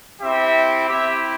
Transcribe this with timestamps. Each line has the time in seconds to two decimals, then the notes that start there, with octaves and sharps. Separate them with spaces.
0.21 C4 E4 G4 E5
0.88 C4 E4 G4 E5